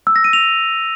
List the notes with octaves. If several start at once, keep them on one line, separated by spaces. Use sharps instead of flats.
E6
A#6
D#7
F7